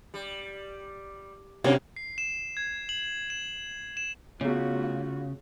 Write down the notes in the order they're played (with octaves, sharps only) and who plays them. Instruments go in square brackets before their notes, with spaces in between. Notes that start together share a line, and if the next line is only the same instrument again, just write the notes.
[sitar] G3
[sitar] F#2 A#3 [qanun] C3 [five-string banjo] C#4 F#4
[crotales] C7
E7
G#6
F#7
E7
E7
[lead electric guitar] C#3 [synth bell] A3 B3 [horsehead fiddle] F4 F#4 [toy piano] G#4 C#5